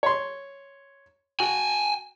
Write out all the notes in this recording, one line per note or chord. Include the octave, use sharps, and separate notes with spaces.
C#5 C6
F#4 G5 G#5